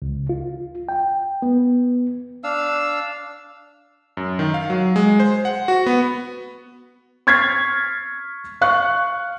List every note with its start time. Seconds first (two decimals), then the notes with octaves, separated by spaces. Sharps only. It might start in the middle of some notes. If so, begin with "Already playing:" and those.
0.02 C#2
0.29 F4
0.89 G5
1.42 B3
2.44 D4 F5 E6
4.17 F#2
4.39 D#3
4.54 F5
4.70 F#3
4.96 G#3
5.20 C5
5.45 F#5
5.68 F#4
5.86 B3
7.27 C#6 F6 G#6 A6 B6 C7
8.61 F5 C#6 F#6